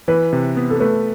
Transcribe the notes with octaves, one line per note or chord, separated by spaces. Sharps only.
E3 B4
C3
B3
A4
A3 B4